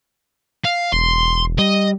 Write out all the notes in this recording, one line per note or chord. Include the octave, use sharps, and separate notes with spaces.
F5
E1 C6
G3 D#5